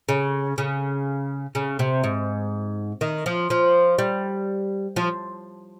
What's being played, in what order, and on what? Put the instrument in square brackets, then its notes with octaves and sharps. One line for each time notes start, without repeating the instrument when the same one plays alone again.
[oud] C#3
C#3
C#3
C3
G#2
D#3
F3
F3
G3
F3